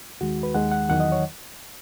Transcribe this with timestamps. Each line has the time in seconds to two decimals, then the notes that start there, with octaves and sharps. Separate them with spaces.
0.21 D#2 D#3 G#3 F#4
0.43 B4
0.54 D#2 D#3 G#3 F#5
0.72 F#5
0.89 E2 D#3 F#3 F#5
1.00 D#5
1.12 C#5